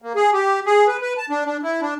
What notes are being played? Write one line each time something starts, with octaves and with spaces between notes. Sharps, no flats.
A#3
G#4
G4
G#4
B4
B4
A5
D4
D4
E4
D4